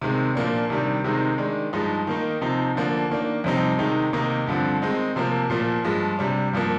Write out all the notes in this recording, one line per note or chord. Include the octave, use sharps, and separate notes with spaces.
C3 D#3 G#3 C4
A#2 F3 A#3 D4
C3 D#3 G3 D4
C3 D#3 G#3 C4 D#4
D#3 G#3 D4
G2 F3 G#3 D#4
D#3 A#3 D#4
C3 F3 C4 D#4
D3 F3 A#3 D4
D#3 A#3 D4
F2 C3 G3 C4 D#4
C3 D#3 G#3 D#4
C3 D#3 A#3 D#4
G2 D3 F3 C4
D#3 G#3 C4 D#4
C3 F3 A#3
A#2 F3 A#3
G2 F3 G#3
C3 G3 D4
G2 F3 A#3